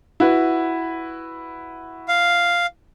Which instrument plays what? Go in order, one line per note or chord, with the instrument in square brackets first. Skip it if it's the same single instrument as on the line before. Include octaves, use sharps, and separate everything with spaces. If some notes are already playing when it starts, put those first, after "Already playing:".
[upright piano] E4 F#4 B4
[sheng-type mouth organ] F5